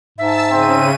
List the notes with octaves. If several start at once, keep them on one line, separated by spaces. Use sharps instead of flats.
G#2 E5 A5 E6
C#3 C4 D#7